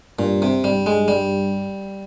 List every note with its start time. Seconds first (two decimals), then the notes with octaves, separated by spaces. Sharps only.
0.19 G2 A#2
0.42 C3
0.64 G2 G3
0.86 G#3
1.08 G3